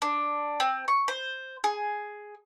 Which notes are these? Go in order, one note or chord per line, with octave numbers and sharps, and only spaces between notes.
D4
C4
C#6
C5
G#4